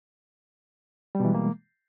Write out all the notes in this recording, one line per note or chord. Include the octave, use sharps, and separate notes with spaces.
B2 E3 G3 G#3 A#3